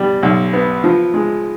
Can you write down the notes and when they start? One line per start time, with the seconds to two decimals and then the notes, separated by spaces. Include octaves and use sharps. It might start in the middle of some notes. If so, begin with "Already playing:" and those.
Already playing: B2 G3
0.23 B1
0.53 B3
0.84 F3
1.14 G#3